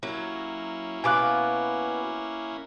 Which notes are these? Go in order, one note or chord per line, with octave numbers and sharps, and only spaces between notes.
F#3 A#3 C#4 E4
B2 B3 F5 G#5 D6 F#6